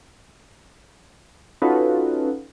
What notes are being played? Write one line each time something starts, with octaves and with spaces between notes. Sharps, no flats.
C#4 D#4 F4 F#4 A4 B4